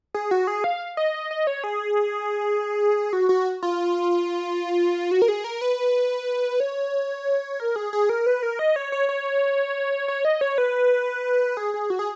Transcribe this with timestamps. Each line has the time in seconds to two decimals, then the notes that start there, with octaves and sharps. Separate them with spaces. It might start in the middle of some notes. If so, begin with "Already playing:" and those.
0.14 G#4
0.31 F#4
0.47 G#4
0.64 F5
0.97 D#5
1.14 D#5
1.31 D#5
1.47 C#5
1.64 G#4
3.13 F#4
3.29 F#4
3.63 F4
5.11 F#4
5.22 A#4
5.28 G#4
5.44 A#4
5.61 B4
6.60 C#5
7.60 A#4
7.76 G#4
7.93 G#4
8.09 A#4
8.26 B4
8.43 A#4
8.59 D#5
8.76 C#5
8.92 C#5
9.09 C#5
10.08 C#5
10.25 D#5
10.41 C#5
10.58 B4
11.57 G#4
11.74 G#4
11.90 F#4
11.99 G#4